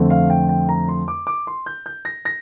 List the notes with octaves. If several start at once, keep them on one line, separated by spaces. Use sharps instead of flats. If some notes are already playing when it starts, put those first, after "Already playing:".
Already playing: F2 D3 A3 C4
F5
G5
G5
A#5
C6
D6
D6
C6
G6
G6
A#6
A#6